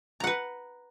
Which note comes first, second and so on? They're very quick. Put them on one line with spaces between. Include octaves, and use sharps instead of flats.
A#5 F#5 B4